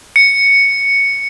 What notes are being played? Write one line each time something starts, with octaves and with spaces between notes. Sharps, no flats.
C#7